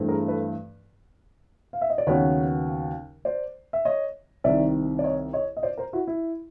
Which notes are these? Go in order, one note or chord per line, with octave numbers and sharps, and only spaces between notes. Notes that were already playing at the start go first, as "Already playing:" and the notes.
Already playing: G2 E3 A3 C4
G#4 A#4
A4 B4
F5
E5
D#5
D5
D#2 C#3 F#3 B3 B4 C#5
C5 D5
E5
C#5 D#5
C2 C3 D#3 D5 E5
D5
C#5 D#5
C#5 D#5
D#5
C5 D5
A#4 C5
E4 F#4
E4